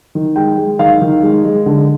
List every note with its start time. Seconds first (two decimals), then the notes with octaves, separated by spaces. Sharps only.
0.15 D#3
0.36 G#3 G5
0.58 G#3
0.79 D#3 F5
1.02 D#3
1.23 G#3
1.45 G#3
1.66 D3